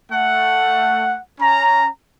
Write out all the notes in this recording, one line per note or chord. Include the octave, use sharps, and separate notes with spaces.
A3 F#5
C#4 A#5